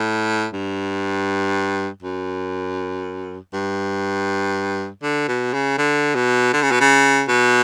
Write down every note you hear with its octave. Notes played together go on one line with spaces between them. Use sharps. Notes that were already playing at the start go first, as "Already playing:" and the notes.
Already playing: A2
G2
F#2
G2
D3
B2
C#3
D3
B2
D3
C#3
B2
C#3
B2